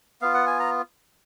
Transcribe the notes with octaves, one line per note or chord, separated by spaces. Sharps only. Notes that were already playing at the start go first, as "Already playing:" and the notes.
B3 F4 F5
F#5
G#5
A#5